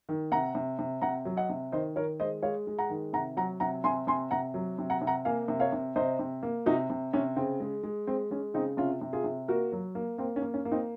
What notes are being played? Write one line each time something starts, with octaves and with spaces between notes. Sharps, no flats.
D#3
C3 F#5 A#5
C3
C3
C3 F#5 A#5
F#3
D#5 F#5
C3
D#3 C5 D#5
D#3 A#4 C#5
G#3 C5 D#5
G#3 C#5 F5
G#3
F#5 A#5
D#3
C3 F#5 A#5
F#3 F#5 A#5
C3 F#5 A#5
C3 G#5 C6
C3 G#5 C6
C3 F#5 A#5
F#3
C3
F#5 A#5
C3
F#5 A#5
A#3 F5 G#5
C3
C#5 F5
C3
C3 C5 D#5
C3
A#3
C3 D#4 F#4
C3
C3 C#4
C#3 C4
G#3
G#3
G#3 C4
G#3 C#4
C#3 C4 D#4
C3 C#4 F4
C3
F4 G#4
C3
A#3 F#4 A#4
F#3
A#3
A#3 C4
C#4
A#3
C#4
A#3
C4 D#4